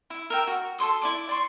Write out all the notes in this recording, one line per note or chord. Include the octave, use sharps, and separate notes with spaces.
E4
A#4 E5 G5
F#4
A4 C#5 C6 D#6
E4 D5 D6
D5 C6 C#6